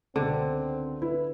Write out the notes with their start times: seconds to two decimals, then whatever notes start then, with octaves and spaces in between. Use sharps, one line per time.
0.16 C#2 B2 D3 C4
1.02 E4 B4